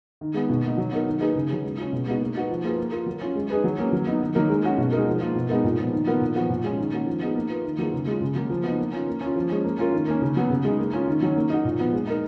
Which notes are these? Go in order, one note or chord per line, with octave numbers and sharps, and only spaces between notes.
D#3
G#3 B3
B2
A#3 D#4
F#3
B3 D#4 A#4
D#3
A#3 D#4 G#4 B4
C#3
F#3 C#4 G#4
G#3
C#4 F4
B2
G#3 B3 D#4 F#4
A#3
D#4 F#4 B4
F3
A#3 F4 G#4 B4
A#3
F4 A#4
F#3
C#4 F4
G#3
D#4 G#4 B4
F#3
A#3 C#4
F#3
B3 D#4
D#3
F#3 A#3 D#4 A#4
G#3
C#4 F#4
B2
G#3 D#4 A#4
F3
A#3 F4
B2
G#3 B3 D#4 A#4
A#2
F3 B3
D#3
F#3 B3 F4 A#4
A#2
F3 B3 F#4
A#2
G#3 C#4 F4
D#3
A#3 C#4 F#4
F3
B3 D#4 G#4
A#3
F4 B4
D#3
F#3 A#3 F4 G#4
C#3
G#3 C#4 F4
C#3
F#3 A#3
F3
B3 D#4
A#3
C#4 F4
A#3
C#4
F4
F3
G#3 C#4
A#3
C#4 F4 A#4
D#3
A#3 C#4
C#3
F#3 B3
C#3
G#3 D#4
A#3
C#4 F4
D#3
F#3 C#4
A#3
D#4 F#4
A#2
F3 B3
G#3
D#4 A#4